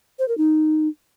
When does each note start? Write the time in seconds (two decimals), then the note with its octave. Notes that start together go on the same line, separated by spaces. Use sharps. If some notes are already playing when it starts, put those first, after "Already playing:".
0.19 C5
0.28 A#4
0.38 D#4